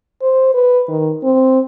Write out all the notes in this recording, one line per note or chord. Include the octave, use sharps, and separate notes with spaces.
C5
B4
D#3
C4